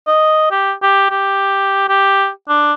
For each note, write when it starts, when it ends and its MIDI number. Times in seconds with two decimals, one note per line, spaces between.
0.07 0.47 75
0.51 0.73 67
0.82 1.10 67
1.10 1.84 67
1.89 2.29 67
2.49 2.73 62